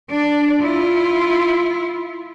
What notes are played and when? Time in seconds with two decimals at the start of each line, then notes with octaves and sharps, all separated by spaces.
0.10 D4 D5
0.62 E4 F4